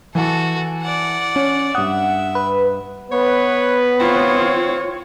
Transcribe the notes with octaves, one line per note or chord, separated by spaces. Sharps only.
E3 F#4 A4 A5
D5 F#5
C#4
G2 E5 F#5 D#6
B4
B3 B4 C#5
C4 F4 C#5